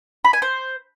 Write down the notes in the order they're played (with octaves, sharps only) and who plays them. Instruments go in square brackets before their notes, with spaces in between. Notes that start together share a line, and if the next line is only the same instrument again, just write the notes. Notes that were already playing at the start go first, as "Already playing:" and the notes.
[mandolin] B5
G#5
C5